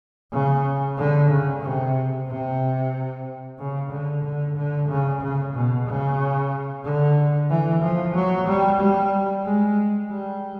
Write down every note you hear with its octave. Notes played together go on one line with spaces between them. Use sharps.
C#3
D3
C#3
C3
C3
C#3
D3
D3
D3
C#3
C#3
B2
C#3
D3
E3
F3
F#3
G3
G3
G#3
G3